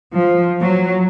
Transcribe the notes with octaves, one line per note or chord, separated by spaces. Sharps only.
F3
F#3